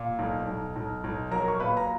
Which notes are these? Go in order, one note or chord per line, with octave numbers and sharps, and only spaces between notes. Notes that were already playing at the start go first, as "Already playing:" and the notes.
Already playing: A#2
B1
B1
B1
B1
F#3 A#4 A#5
C#6
A#2 B4 B5
A#5